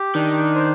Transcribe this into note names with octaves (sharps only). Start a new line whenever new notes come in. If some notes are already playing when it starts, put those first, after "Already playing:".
Already playing: G4
D#3 D4
C5